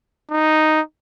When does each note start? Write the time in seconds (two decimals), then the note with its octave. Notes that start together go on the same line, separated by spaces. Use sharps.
0.31 D#4